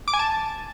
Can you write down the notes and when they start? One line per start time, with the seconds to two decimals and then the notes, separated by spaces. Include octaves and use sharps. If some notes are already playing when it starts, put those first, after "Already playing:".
0.08 D6
0.13 G#5
0.19 A5